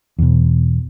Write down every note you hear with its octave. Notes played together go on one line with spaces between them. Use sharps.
E2 B2